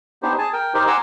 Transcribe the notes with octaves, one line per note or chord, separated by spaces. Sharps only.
B3 D4 D#4 G4 C5
G#4 G#5 A5
A#4 G5
D#4 G4 A#4 C5
F#5 G#5 A#5 C6 D6 E6